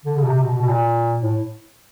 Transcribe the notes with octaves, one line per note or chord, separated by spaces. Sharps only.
D3
C#3
B2
C3
B2
B2
B2
A#2
A2